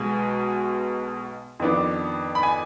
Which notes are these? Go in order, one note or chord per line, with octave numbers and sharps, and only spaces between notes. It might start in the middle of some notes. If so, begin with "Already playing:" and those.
Already playing: B1 B2 G#3 G#5
F2 D#3 B3 D4
B5
G#5